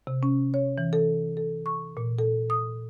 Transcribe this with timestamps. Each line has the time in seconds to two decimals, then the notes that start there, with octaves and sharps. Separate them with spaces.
0.07 C3
0.23 C#4
0.54 C#5
0.78 E3
0.93 A4
1.37 A4
1.66 C#6
1.97 A#2
2.19 A4
2.50 D#6